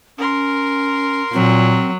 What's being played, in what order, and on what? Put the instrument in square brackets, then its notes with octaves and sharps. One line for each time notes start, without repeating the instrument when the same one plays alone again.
[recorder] C#4 [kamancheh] A#4 C6
[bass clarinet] A#2 [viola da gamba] F#3 [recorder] C4